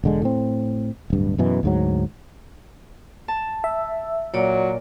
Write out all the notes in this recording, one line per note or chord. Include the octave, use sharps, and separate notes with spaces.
E1 D3 G#3
A2 C4
D1 G2
F#2 B2 E3
D2 G#2 F#3
A5
E5
A#2 F#3 C#5 D5